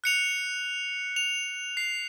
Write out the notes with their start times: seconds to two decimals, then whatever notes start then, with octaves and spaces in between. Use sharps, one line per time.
0.04 F#6 C#7 F7
1.16 F7
1.77 C7